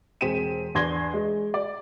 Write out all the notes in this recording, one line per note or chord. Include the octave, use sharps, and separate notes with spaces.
E1 C4 G#4 B6 D#7 E7
E2 D4 C6 G#6 A#6 G7
G#3
D5